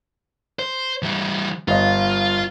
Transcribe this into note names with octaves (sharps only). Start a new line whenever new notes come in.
C5
E3 G3
G1 F4 D#5